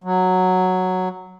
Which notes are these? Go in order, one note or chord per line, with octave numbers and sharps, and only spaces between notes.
F#3